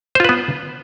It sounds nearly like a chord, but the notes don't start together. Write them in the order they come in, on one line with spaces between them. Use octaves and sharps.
C5 F4 B4 B3